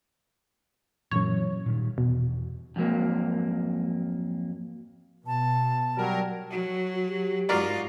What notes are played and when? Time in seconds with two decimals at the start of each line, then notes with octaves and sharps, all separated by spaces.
1.11 F#2 A#2 E3 F#3 C#5
1.66 A#2 D#3 G3
1.98 E1 B2
2.76 F2 G#2 F#3 A#3
5.27 B2 A5
5.97 F#3 G3 A#4
6.51 F#3 F#4
7.08 G4
7.49 G#2 F4 F#4 A#4 D5